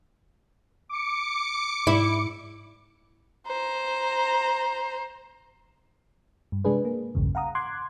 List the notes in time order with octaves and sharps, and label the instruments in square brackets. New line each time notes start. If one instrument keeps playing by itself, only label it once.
[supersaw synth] D6 C#7
[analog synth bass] G#2 [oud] E4
[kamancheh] C5 A#5
[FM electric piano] G2
C3 G#3 D4 G#4 B4
A#3
A#1 E2 G2 C#3
F5 F#5 A#5 D#6
C6 D6 F#6 G#6